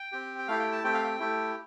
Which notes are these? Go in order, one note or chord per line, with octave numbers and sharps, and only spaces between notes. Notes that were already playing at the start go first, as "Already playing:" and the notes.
Already playing: G5
C4 G4
G5
A3 E4 G4 F5
G5
A5
A3 C4 G4 G5
F5
G5
A3 E4 G4